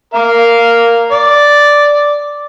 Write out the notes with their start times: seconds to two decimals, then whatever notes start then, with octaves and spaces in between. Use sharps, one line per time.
0.14 A#4 F5
1.12 D5